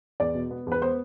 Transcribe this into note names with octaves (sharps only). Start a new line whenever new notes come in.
E2 D5
B2
B3
E2 B4
B3 C5